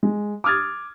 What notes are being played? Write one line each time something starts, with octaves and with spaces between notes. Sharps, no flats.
G#3
D6 D#6 F6 G#6 A6